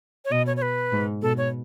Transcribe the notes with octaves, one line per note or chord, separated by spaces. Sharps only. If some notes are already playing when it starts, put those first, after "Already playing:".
C#5
B2 D#5
C#5
C#5
B4
G#2
B2 A4
C#5